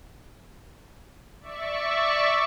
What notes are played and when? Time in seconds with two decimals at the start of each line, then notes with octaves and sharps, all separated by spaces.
1.40 D5 E5 C#6